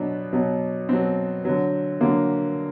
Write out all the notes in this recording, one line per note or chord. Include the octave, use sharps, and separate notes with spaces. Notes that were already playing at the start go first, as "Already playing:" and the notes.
Already playing: B2 F#3 B3 D4
B2 F#3
B2 F#3 C4
D3 F#3
D3 F#3 A#3